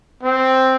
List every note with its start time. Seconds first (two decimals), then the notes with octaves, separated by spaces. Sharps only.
0.23 C4